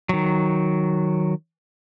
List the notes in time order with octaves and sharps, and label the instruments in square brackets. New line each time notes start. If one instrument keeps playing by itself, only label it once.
[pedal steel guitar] D#3 F#3